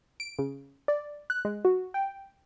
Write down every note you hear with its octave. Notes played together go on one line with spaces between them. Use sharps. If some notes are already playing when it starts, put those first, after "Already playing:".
D7
C#3
D5
F#6
G#3
F#4
G5